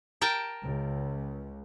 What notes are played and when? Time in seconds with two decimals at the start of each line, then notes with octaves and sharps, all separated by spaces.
0.21 A#4 G5 A5
0.63 C#2